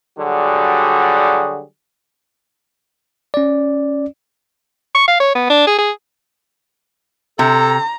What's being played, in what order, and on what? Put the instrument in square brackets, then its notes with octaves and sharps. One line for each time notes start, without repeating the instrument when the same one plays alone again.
[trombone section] D3 F#3 G3 F#4 G#4
[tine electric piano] C#4 D5
[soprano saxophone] C#6
F5
C#5
B3
D4
G#4
G#4
[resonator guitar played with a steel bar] C3 [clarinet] A4 [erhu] A#5